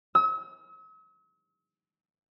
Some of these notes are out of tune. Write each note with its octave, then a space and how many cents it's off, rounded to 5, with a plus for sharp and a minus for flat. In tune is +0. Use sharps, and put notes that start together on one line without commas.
E6 -45